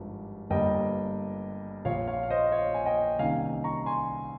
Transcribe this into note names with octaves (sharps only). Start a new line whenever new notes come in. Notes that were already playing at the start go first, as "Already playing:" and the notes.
Already playing: G#1 G2 F3
G1 G2 G3 A#3 D#5 G5
A#1 A#2 F3 C#5 F5
C#5 F5
F5
C5 D#5
C#5 F5
G#5
D#5 G5
C2 C3 D#3 A#3 C#4 F5 G#5
A#5 C#6
G#5 C6